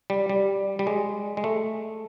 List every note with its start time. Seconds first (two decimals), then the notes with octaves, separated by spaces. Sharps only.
0.10 G3
0.30 G3
0.79 G3
0.87 G#3
1.37 G#3
1.44 A3